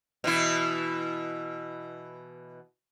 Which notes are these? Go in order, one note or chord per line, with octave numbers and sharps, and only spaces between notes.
B2 E3 E4